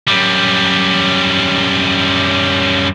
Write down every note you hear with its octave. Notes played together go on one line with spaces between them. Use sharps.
F#2 G3